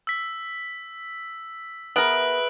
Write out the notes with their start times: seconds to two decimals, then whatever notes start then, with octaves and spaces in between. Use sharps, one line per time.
0.07 E6 B6
1.96 B3 G#4 A#4 B4 E5 F#6 D7 F#7